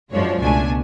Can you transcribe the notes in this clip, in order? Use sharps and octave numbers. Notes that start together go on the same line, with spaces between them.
F#2 F3 G#3 D4 C#5
C#2 B2 A3 D4 G#5